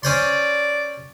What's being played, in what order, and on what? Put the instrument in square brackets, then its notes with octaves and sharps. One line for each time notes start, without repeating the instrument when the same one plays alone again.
[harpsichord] C#4 C5 C6 [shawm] D5